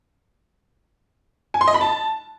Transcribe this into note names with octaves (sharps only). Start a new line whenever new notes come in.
G#5
C6
D#5
B5
A5